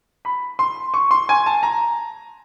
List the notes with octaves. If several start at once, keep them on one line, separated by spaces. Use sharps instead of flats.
B5
C6
C#6
C6
G#5
A5
A#5